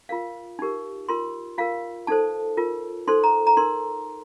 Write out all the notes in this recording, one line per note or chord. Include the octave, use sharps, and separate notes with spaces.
F4 A#4 F5
D#4 G4 A#4
F4 A#4 C6
F4 A#4 F5
D#4 A4 C5 A5
F4 A#4
D#4 A4 C5 C6
A#5
A#5
D#4 A#4 C6